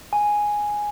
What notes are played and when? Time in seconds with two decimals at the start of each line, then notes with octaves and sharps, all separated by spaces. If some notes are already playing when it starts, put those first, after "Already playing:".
0.13 G#5